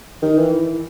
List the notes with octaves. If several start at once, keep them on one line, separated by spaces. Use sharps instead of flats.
D#3
E3